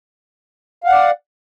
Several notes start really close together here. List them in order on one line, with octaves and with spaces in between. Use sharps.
F5 F#5 D5